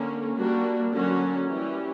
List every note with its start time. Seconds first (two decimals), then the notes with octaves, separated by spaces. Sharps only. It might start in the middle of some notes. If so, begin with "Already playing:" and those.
Already playing: D3 A#3 C#4
0.38 G3 A#3 D4 F#4
0.93 D3 F#3 A#3 C#4 F#4
1.48 E3 G3 C#4 G4